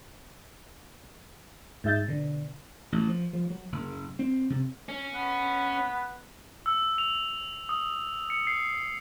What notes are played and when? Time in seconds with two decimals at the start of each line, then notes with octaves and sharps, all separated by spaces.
1.84 G#2 D#4 E5 G6 A6
2.08 B2 D3
2.92 A1
3.08 F3
3.33 F3
3.50 F#3
3.72 F#1
4.19 C4
4.50 C3
4.89 C#4
5.14 B3
6.66 E6
6.98 F7
7.69 D#6
8.30 C#7
8.47 C7